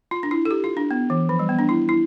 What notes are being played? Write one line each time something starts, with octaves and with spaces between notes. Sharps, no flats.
F4
D4
E4
A4
G4
F4
D4
B3
E3
F3
G3
B3
D4
E4
E4